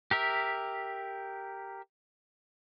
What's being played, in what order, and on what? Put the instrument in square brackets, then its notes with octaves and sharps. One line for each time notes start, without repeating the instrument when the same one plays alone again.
[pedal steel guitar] G4 A#4 E5